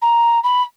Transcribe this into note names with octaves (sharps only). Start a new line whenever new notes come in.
A#5
B5